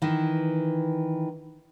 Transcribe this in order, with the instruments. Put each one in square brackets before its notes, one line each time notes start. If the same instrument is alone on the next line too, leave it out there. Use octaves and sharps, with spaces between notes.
[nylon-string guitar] D#3 E3